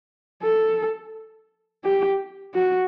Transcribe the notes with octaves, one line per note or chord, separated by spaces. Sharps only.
A4
G4
F#4